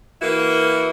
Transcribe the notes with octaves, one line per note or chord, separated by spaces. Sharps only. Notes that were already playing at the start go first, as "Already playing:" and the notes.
E3 A#3 E4 F#4